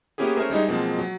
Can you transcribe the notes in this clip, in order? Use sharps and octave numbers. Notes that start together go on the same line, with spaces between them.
A#3 B3 C#4 E4 G4 G#4
A3 C#4 A#4 C5 E5
G3 G#3 D#4 E4
B2 F3 F#3 G#3 A#3 C4
F#3